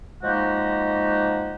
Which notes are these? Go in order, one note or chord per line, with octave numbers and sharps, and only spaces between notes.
F3 G#3 A#3 D#4 F#4 G4